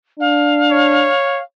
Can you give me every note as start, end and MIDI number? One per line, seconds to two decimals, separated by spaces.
0.20 1.10 62
0.20 1.41 77
0.71 1.41 73